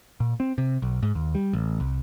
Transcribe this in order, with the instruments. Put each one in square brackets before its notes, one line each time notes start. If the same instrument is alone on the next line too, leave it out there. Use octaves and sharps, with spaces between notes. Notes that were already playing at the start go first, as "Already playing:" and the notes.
[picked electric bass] A#2
C4
C3
B1
G#2
D#2
G3
A1
C2